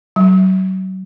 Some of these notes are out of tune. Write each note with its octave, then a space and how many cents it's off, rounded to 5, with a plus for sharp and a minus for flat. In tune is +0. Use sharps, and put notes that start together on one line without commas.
F#3 +30